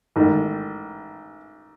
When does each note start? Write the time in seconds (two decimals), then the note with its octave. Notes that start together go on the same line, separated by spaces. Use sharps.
0.16 A1 G#2 D#3